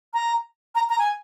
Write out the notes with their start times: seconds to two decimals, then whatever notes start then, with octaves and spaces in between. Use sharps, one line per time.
0.14 A#5
0.75 A#5
0.89 A#5
0.99 G#5